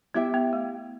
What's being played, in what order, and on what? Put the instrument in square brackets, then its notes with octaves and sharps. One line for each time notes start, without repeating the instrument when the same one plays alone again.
[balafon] B3 [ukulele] E4 G4 E5 G5
[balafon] B3
A3